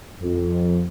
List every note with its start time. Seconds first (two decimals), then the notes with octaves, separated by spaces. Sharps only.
0.22 F2